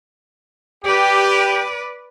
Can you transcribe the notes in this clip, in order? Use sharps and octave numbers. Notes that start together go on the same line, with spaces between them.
G4 B4 D5